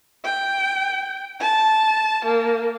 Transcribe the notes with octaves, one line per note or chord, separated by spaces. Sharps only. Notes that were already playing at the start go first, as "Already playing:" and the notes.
G5
A5
A#3